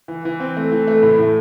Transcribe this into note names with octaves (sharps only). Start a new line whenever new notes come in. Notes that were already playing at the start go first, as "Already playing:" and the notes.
E3
E3
C4
A3
E3
A3
A2
A2